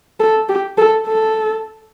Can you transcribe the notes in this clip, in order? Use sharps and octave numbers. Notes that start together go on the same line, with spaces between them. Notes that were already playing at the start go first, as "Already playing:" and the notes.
A4
G4
A4
A4